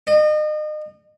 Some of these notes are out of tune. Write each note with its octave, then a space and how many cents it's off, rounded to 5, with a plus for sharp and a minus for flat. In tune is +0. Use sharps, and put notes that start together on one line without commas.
D#5 -35